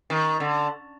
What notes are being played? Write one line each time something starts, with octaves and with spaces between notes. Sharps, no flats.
D#3
D3